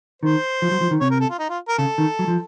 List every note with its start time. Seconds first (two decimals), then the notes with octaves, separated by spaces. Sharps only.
0.22 D#3 C5
0.62 F3
0.71 F#3
0.81 F3
0.91 D#3
1.00 C3 C#5
1.11 A#4
1.20 A4
1.30 F4
1.39 D#4
1.50 F4
1.69 A#4
1.78 C#3 A4
1.98 D#3
2.19 F#3
2.28 F3